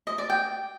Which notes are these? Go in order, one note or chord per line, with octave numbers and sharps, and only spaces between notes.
D#5
D5
G5